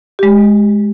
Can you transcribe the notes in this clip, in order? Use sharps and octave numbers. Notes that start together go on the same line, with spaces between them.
G#3 G4